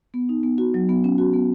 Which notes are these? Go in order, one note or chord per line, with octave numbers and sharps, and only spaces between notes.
B3
D#4
B3
F#4
F#3
B3
C#4
F#4
B3